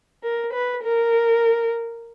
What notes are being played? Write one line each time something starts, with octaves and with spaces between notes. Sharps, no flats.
A#4
B4
A#4